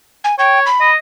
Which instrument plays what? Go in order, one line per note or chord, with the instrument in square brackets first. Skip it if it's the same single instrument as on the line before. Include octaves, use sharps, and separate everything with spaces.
[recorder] G#5
[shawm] C#5 [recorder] G5
[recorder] B5
[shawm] D#5